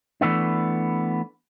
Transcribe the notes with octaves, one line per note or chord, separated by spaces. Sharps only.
E3 A3 B3 D4